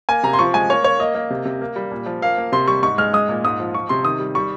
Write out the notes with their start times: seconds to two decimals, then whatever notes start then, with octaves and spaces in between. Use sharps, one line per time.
0.09 A#3 G#5
0.23 C3 A#5
0.33 C6
0.39 F3 C#6
0.54 G#3 G#5
0.70 A#3 C#5
0.84 A#3 C#5
1.00 A#3 D#5
1.15 A#3
1.30 C3
1.45 C3
1.61 A#3
1.76 G3
1.91 A#2
2.06 F3
2.22 A#3 F5
2.38 A#3
2.52 C3 C6
2.67 G3 C#6
2.83 G#2 C#6
2.98 G#3 F6
3.13 G#3 D#6
3.29 A#2
3.44 G#2 D#6
3.60 F3
3.74 F3 C#6
3.89 C3 C6
4.05 D#3 D#6
4.20 G3
4.35 G3 C#6